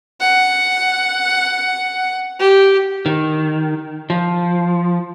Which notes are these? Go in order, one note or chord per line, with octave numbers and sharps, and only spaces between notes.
F#5
G4
D#3
F3